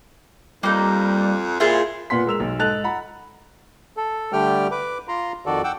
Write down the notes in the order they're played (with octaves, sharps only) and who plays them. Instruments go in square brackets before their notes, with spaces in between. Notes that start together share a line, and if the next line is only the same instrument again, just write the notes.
[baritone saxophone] F2 [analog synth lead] G3 [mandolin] A#3 D#4
[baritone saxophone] A#2 [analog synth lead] E4 [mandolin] F4 G#4 C5
[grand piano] A#2 B3 F#5 C6 B6
G#3 A#4 E6 F7
B1
G#2 A4 D#5 F#6 A6 F7
F#5 A#5 B5
[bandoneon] A4
D3 G3 A3 G4 G5 F6
B4 D6
F4 A#5 C6
F2 D#3 F#4 A4 D5
F#5 G5 D6 E6